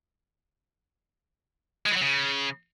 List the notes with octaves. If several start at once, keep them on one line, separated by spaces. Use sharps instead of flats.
G#3
E3
F#3
C#3